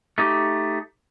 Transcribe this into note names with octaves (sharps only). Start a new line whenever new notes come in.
A3 D#4 G4